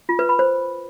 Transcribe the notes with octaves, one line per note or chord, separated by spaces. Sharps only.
F4
B4
B5
C5